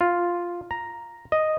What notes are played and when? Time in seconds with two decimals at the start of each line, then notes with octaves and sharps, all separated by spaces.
0.01 F4
0.71 A#5
1.32 D#5